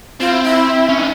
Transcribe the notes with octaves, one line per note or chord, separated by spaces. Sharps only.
C4 F4
E4
E4
C#4
D#4